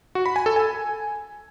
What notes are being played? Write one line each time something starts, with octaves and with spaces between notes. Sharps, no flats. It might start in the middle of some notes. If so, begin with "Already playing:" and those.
F#4
B5
G#5
A4
G#5